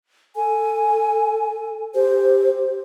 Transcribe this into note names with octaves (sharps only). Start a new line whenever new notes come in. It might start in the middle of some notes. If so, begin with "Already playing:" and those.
A4 G#5
G4 C5